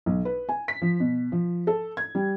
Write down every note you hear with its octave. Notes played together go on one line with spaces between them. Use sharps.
B1
B4
G#5
B6
F3
B2
F3
A4
G#6
G3